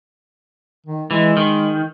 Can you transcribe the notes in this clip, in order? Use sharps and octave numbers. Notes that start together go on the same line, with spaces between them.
D#3
E3 G#3
D#3